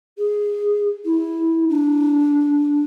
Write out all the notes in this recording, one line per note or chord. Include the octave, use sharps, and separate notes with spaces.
G#4
E4
D4